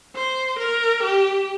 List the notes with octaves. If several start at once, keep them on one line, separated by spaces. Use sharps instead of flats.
C5
A#4
G4